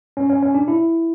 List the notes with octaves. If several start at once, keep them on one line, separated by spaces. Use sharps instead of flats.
C#4
C#4
C#4
D4
E4